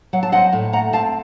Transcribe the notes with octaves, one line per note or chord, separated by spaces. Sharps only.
F#3 F#5
A5
C4 D#5 F#5
A2
A3 F#5 A#5
C4 F5 A5